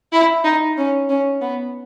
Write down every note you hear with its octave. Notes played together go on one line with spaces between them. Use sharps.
E4
D#4
C#4
C#4
B3